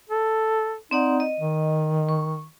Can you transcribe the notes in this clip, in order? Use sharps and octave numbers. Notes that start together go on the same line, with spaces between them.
A4
C4 D#4 D5 F#5
D#5
D#3
C#6